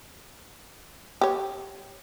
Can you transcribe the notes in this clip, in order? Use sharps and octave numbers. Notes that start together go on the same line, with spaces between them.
G4 C#5